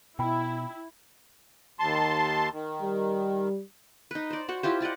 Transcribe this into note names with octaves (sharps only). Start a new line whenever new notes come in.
B2 E4 G5 B5
D#2 A5 C6
D#3
G3
D#4 B4
C5 D5
F#4 C5 F#5
E4 F4 G4 C5
G4 D5 D#5 F#5